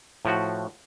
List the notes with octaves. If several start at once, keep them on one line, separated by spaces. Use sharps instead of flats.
A2 F3 F#4